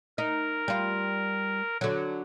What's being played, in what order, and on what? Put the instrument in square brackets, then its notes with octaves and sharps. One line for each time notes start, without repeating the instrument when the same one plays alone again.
[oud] D#4 [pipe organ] A#4
[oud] G3 F4
D3 F#3